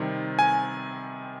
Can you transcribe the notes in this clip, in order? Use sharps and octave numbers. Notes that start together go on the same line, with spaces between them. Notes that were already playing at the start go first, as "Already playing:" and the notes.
Already playing: C3 D#3 G3 C4
G#5